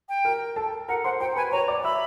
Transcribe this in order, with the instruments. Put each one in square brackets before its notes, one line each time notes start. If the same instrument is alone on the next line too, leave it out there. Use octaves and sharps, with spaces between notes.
[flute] G5
[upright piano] A#4 A#5
A4 A5
[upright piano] A#4 A#5 [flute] F#5
[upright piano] C5 C6 [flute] F#5
[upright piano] C5 C6 [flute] G5
[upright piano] B4 B5 [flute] G#5
[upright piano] C#5 C#6 [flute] A#5
[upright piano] D5 D6
[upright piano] E5 E6 [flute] B5